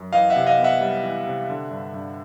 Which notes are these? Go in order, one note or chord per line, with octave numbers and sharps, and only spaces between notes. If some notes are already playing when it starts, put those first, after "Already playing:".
Already playing: F#2
E3 D#5 F5
E5 F#5
C3
D#5 F5
B3
E5 F#5
G3
E3
C3
D3
G2
G2